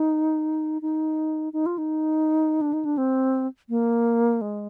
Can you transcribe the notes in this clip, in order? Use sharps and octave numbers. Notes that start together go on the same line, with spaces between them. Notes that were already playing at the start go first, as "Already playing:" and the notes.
Already playing: D#4
D#4
D#4
F4
D#4
D4
D#4
D4
C4
A#3
G#3